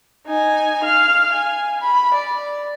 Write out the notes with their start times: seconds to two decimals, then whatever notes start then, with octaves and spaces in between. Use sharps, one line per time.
0.27 D#4 G#5
0.83 F5 F6
1.33 G#5
1.81 B5
2.14 D5